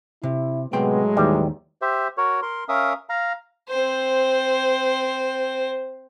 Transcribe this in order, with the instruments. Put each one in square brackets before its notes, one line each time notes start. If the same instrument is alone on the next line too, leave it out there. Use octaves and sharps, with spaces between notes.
[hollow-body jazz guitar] C3 [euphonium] E4
[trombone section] A2 F#3 G#3 [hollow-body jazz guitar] C3 G5 C6 [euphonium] B3
[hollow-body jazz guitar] D#2 D#3 [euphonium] E3 [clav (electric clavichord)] G3
[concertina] G4 C5 E5
F#4 A#4 C#5
A#4 C6
C#4 A#4 E5 F5 D#6
F5 A#5
[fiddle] C4 C5